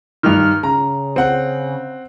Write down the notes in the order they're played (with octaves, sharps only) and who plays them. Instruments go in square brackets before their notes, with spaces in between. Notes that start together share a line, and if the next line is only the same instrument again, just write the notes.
[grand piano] G2 D#3 [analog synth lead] F6
[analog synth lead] C#3 [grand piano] A#5
[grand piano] C4 F#5